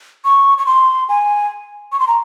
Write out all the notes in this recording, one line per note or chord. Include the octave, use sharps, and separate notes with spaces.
C#6
C#6
C6
G#5
C#6
C6
A#5